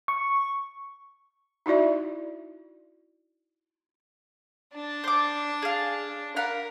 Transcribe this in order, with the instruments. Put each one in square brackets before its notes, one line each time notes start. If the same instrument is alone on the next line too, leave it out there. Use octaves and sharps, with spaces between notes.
[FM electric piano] C#6
[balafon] D#4 E4 F#4 D5 E5
[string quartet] D4 A5
[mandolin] C5 D6
G#4 F5
[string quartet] A#4 [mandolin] F5 F#5 B5